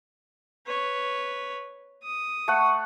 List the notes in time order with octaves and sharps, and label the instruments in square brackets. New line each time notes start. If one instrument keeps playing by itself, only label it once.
[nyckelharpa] B4 C#5
D#6
[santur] A3 F#5